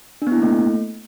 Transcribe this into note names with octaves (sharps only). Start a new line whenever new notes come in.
D4
B3
E4
A#3
A3